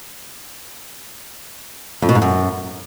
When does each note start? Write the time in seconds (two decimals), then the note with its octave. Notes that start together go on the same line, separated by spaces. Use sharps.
2.02 F2
2.09 B2
2.15 G#2
2.22 F#2